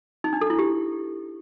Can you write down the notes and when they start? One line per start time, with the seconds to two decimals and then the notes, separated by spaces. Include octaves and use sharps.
0.24 D#4
0.33 D4
0.41 A4
0.50 E4
0.59 G4